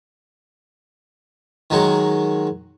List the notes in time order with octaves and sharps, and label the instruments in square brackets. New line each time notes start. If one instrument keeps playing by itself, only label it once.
[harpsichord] D#3 F#3 G#3 F#4